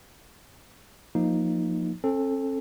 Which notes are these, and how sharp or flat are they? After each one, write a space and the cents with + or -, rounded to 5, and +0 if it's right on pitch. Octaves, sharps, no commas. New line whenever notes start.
F3 +15 A#3 +0 D#4 +0
C4 +45 A4 +0